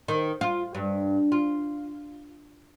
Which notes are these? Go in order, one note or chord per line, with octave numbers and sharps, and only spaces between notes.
D#3
F4
G2
F4